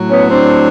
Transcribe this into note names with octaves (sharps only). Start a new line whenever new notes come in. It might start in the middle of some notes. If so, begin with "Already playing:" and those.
Already playing: A2 F#3
B3 C#4
C4 D4